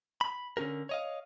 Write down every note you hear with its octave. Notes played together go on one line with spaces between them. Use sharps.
B5
D3 C#4 G4 A#4
C#5 D#5 F5